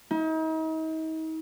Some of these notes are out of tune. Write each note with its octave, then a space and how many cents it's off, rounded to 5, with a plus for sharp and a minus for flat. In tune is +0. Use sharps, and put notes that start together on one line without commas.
D#4 +40